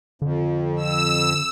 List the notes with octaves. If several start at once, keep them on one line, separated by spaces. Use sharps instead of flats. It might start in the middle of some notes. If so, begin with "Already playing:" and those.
F2 D3
E6